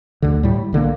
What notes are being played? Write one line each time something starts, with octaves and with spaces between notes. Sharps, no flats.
D2 D3
A2 G3
B1 D3 G3 A#3